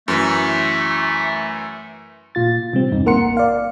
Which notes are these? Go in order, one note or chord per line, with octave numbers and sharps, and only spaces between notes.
F#2 E3 A3
A#2 F4 A6
C3 G3 C4
E2 G2 D#4
A1 A#3 A#4 F#5 C6 C#7
D5 F5